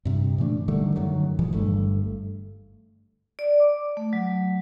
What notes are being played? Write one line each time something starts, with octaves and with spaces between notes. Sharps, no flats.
G2 C3
A#2 E3 A3 D4
D3 D#3 G3 A3
F#2 D3 D#3 F#3
A#2 E3 F3 G#3
G1 G2 A3
D5
D6
A3
F#3